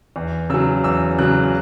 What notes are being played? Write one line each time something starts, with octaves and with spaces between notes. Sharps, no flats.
E2
C#3 F#3 E6
E2 E6
C#3 F#3 F#6
F#6